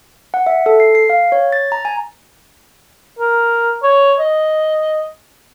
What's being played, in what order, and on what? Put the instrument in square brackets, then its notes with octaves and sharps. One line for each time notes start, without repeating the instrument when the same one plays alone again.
[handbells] F#5
E5
A4
C7
C7
F5
C#5
A6
A#5
G#5
[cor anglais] A#4
C#5
D#5